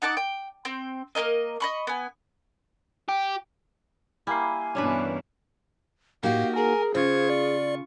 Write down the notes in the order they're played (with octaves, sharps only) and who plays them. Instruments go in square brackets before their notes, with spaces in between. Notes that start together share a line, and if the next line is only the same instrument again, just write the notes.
[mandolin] D#4 F#5 A5 D6
G5
C4 G5
A#3 G4 A#4 D#5
D#5 B5 C#6
B3 G#5
[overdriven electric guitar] G4
[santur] G3 A#3 C6 [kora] E4 [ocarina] G#5
[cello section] G2 B2 E3 [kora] C#4 D4 B4
[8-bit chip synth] A2 [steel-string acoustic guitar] A#3 D#4 F#4 [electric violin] G4 [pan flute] F5
[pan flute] G#4 [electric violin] A#4 [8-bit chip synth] G#5
[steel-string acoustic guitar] C#3 [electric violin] F4 C#6 [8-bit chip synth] C5 G#6
[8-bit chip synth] D5